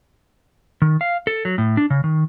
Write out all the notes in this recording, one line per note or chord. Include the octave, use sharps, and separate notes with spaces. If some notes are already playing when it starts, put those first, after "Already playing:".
D#3
F5
A4
F#3
A2
D4
C#3
D#3